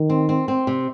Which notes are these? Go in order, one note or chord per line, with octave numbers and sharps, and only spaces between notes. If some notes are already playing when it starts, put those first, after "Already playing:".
Already playing: D#3
C4
C4
C4
C3